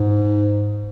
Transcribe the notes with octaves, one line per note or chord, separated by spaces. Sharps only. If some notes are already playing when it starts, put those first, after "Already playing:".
Already playing: G#2